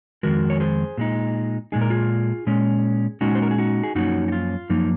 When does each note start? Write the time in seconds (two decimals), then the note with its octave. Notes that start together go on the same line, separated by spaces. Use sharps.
0.23 F2 D#3 G#3 F#4 A#4
0.50 C#5
0.60 G#4 C5
0.98 A#2 G#3 D#4
1.72 A#2 G#3 D#4 G#4
1.81 A#4
1.90 F4 G#4
2.47 A#2 G#3 C#4
3.21 A#2 G#3 C#4 D#4 F#4
3.35 C5
3.42 A#4
3.51 G#4
3.58 D#4 F#4
3.83 G#4
3.95 F#2 F3 A#3 C#4 D#4 F#4
4.28 F#4
4.32 F4
4.70 F#2 F3 A#3 D#4